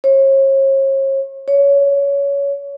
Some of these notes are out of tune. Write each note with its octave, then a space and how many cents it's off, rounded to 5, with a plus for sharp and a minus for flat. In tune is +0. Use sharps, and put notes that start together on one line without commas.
C#5 -40
C#5 +20